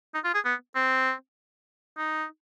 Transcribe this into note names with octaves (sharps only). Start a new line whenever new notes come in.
D#4
F4
G#4
B3
C4
D#4